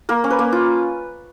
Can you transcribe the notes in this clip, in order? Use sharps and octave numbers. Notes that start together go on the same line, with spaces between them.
A#3 A#4
C#4
B4
A#3
F4